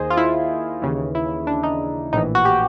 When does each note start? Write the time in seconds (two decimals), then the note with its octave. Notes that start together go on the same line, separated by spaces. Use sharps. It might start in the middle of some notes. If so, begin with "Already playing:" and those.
Already playing: D#2 D#3 G#4 C5 D#5
0.10 F4
0.17 E4
0.82 D#2 C#3 E3
1.15 E4
1.47 D4
1.63 D#4
2.13 A#1 A2 E3 D#4
2.35 F#4
2.45 G4